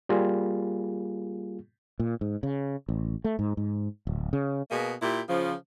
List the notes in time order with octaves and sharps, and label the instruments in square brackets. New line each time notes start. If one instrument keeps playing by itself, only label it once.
[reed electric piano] G3 A#3 F4 G#4
[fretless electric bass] A#2
G#2
C#3
A1
A3
G#2
G#2
D1
C#3
[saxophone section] B2 A#3 G#4
A#2 E4 G4
C#3 F3